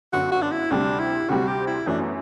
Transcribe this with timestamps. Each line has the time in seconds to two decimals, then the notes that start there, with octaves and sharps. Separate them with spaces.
0.13 G1 F#2 D3 F#4
0.32 F#4
0.42 D4
0.52 E4
0.71 D2 C3 G3 C4 D4
0.99 E4
1.29 D2 C3 G3 C4 F#4
1.47 G4
1.67 E4
1.86 F#2 E3 A3 D4
2.01 B3